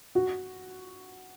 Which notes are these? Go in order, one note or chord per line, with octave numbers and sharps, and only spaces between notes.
F#4